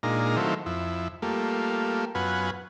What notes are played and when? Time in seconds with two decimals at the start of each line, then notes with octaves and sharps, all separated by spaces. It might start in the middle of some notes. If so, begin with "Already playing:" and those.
0.03 A#2 G#3 D4 D#4 F4 A#5
0.37 D#3 F#3 A3 C4 E4 F4
0.66 F2 E4
1.22 G3 A3 A#3 F4
2.15 F#2 B3 F4 B4 F#5 G#5